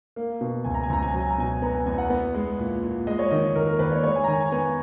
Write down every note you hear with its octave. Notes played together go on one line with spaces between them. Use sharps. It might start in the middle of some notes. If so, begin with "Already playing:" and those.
A#3
B2
C#2 G#5
A#5
G#5
C#2 A#5
G#5
F#3 A#5
G#5
A#5
B2 G#5
B3 A#5
G#5
E2 G#5
F#5
B3
G#3
A#2
A#2
G#3 D#5
C#5
D#3 D#5
D#2 A#4
A#4
D#2 B4
C#5
G#3 C#5
G#5
A#5
D#3 G#5
G#5
B3 G#5